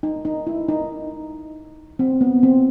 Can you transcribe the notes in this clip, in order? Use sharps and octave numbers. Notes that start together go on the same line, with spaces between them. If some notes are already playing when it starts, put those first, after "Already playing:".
D#4
D#4
E4
D#4
C4
B3
C4